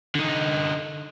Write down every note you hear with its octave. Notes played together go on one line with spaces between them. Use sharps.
D3 D#4